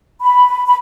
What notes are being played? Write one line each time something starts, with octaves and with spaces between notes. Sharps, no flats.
B5
B5